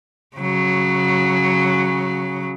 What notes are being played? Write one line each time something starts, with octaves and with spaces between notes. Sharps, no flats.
C#3 F#3